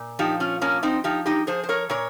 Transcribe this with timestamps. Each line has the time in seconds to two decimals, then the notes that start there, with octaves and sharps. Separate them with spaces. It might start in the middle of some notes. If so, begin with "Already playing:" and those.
Already playing: A#2
0.19 F3 D#4 G4
0.40 C#4 F4
0.61 F3 A#3 C#4
0.83 C4 D#4
1.04 F3 D#4 G4
1.26 D#4 G4
1.47 F3 G#4 C5
1.63 C5
1.69 A#4 C#5
1.89 A#2 A#4 C#5